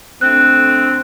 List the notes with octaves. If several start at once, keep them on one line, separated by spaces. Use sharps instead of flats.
D2 A3 C4 F#6